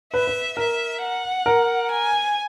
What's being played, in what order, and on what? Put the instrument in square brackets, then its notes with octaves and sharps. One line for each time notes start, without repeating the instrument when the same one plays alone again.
[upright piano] B4 [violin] E5
[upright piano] B4
[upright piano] A#4 [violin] E5
[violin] F#5
[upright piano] A#4
[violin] G#5